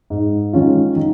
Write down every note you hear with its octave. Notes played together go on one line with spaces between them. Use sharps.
G#2
D#3 G#3 C#4 F4
D#3